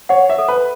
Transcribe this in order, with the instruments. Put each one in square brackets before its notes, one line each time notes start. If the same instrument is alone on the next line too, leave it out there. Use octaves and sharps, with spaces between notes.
[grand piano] C#5 [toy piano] F#5
[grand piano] E5
[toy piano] A4
[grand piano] B4